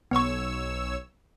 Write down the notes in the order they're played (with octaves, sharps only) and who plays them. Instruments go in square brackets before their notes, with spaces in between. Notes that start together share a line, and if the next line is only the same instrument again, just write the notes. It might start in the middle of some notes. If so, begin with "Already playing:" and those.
[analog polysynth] B1 C#5 E6 [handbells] B3 C#6